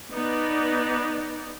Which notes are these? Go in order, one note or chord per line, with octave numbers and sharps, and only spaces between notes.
B3 D#4 D5